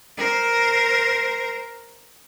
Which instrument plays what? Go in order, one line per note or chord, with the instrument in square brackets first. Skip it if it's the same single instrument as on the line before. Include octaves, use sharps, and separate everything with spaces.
[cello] A#4 C5